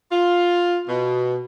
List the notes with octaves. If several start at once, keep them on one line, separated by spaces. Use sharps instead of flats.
F4
B2